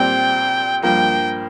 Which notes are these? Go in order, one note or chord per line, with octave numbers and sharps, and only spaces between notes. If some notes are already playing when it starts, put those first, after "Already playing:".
Already playing: A#2 G3 C4 G5
G2 F3 A#3 G5